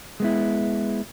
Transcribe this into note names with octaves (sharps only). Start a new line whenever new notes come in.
G#3 B3 E4